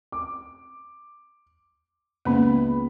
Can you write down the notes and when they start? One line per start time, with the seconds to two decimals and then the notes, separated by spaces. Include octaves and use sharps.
0.12 D6
2.25 C#2 A#3 B3 B5